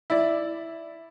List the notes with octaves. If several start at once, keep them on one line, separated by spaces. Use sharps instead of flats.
E4 D5